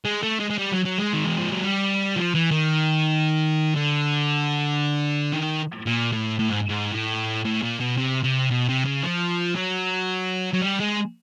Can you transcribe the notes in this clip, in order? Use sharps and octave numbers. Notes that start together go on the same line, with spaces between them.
G#3
A3
G#3
G#3
G3
F#3
F#3
G#3
D#3
E3
F3
F#3
G3
F3
E3
D#3
D3
D#3
A#2
A2
A2
G#2
G#2
A2
A2
A#2
B2
C3
C3
B2
C3
C#3
F3
F#3
F#3
G3
G#3